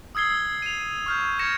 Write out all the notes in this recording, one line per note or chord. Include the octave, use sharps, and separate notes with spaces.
D#6 E6 G#6 C7 G7
D#7 F7
C#6 F6 G6
G#6 A#6 C#7 E7